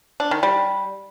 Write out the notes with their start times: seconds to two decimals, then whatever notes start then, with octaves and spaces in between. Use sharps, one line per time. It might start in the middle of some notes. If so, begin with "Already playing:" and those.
0.20 D4
0.31 D#3
0.43 G3